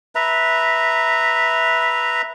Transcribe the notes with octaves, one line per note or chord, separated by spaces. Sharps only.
B4 E5 A#5